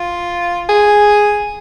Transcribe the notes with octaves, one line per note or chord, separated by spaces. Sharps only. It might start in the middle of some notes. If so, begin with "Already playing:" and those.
Already playing: F4
G#4